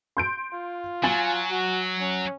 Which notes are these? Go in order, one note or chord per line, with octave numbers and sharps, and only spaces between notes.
C6 G6 D7
F4
F#3 G#5 A6
F#4
C#4